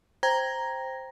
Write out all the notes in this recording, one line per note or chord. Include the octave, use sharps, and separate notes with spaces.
C5 G5 A#5 G#6 A#6